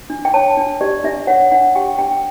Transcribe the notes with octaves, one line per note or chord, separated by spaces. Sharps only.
D4
G5
C#5 A5
D4
G4 D5
D4 E5
C#5 F#5
D4 F#5
G4 G5
D4 G5